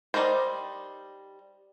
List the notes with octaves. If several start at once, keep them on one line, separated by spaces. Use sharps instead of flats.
G3 D#4 F#4 A#4 C5